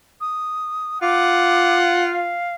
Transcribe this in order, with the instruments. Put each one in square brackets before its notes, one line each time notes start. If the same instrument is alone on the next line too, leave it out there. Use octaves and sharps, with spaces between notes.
[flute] D#6
[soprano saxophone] F4 [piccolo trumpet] F#5 [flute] D6
[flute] F5